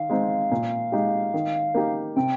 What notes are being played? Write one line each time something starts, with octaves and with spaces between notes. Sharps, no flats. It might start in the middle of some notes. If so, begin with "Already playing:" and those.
Already playing: D#3 F5
G#3 C4 D#4
A#2
G#3 D#4 G4
D#3
A#3 D#4 G4
C3 G5